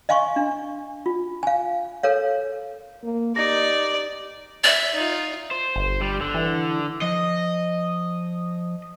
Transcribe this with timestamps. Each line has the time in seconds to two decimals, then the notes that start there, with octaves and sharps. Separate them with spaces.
0.09 D#5 F5 G#5 C6 C#6
0.36 D4
1.06 F4
1.43 F5 G#5
2.03 A4 A#4 C#5 F5
3.03 A#3
3.36 D#4 G4 D5 A#6
4.64 D5 E5
4.95 D#4 F4
5.51 C5
5.76 G1
6.01 G3
6.21 D3
6.35 E3
7.02 F3 D#5